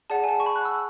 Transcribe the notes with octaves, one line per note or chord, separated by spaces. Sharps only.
G#4 D5 F#5 A5
G#5
A5
C#6
B5
F#6
E6